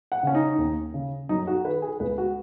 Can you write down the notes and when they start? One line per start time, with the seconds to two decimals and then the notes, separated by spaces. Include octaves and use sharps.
0.12 F#5
0.23 C#3 C#4
0.35 D#4
0.58 D#2
0.94 C#3
1.29 F#2 D#4
1.47 F#4
1.64 D#3 B4
1.82 G#4
2.00 C#2 B4
2.18 F#4